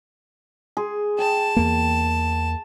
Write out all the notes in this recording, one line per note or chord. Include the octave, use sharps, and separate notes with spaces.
G#4 C6
G5 A5
E2 A#3